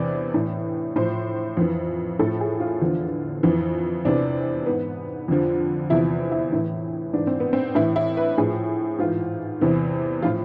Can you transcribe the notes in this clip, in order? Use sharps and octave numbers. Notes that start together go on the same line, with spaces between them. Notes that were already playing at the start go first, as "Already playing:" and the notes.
Already playing: E2 C3 E3 D5
A2 E3
A2 F3 C5
F2 E3
A2 F3 A4
G#4
F4
E2 D3 F3
F2 E3
E2 C3 E3 D4
G#2 E3 B3
F2 D3 F3
E2 C3 F3 E4
E4
A2 E3
G#2 E3 D4
C4
B3
C4
A2 E3 E4
E4
B4
A2 F3 G#4
G#2 E3 F4
E2 C3 E3
A2 F3 F4